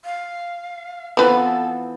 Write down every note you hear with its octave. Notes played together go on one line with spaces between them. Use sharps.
F5
E3 F3 B3 C4 A4 B4